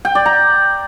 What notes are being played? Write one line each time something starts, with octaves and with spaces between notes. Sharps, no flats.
G5
D5
A#5